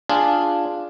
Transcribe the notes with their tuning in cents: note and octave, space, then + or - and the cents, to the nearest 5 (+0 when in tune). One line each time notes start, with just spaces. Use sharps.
D4 +0 F4 -5 G#4 +0